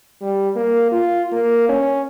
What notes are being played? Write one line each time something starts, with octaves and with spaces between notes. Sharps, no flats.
G3
A#3
F4
A#3
C#4